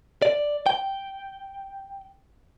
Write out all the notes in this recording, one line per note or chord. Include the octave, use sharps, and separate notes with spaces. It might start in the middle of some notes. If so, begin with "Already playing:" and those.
D5
G5